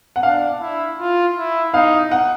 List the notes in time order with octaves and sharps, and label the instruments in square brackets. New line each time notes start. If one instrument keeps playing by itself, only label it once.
[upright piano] F#5
[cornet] D4 [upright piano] F5
[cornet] E4
F4
E4
[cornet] D#4 [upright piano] F5
[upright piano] F#5